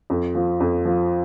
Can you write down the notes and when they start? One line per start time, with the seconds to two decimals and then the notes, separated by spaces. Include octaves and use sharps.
0.10 F2
0.35 F3
0.60 F2
0.85 F3